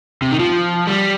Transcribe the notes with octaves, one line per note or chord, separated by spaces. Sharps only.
C3
D#3
F3
G3